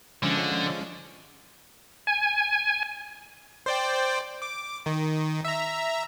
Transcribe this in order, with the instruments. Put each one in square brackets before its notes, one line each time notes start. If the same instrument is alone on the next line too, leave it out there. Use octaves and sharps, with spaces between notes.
[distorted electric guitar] D3 [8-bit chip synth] F3 G#3 C#4
[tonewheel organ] G#5
[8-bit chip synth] C5 D5 G5
D6
D#3
E5 A#5